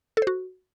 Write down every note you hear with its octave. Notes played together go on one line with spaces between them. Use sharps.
A4
C5
F#4